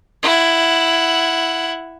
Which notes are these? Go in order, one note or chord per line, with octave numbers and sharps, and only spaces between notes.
E4 F#5